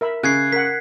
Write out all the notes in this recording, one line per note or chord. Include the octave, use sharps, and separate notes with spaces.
A#4 E5 B5
C#3 F#6 G#6 C7
A#4 F#5 B6